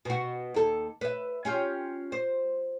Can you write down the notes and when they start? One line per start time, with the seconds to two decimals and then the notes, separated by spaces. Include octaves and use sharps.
0.05 B2 F#4
0.54 D#2 A4
1.01 B4 E5
1.45 C#4 F4 G4
2.12 C5